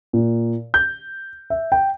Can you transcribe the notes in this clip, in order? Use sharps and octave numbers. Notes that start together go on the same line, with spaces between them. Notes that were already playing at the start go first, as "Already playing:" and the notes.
A#2
G6
E5
G5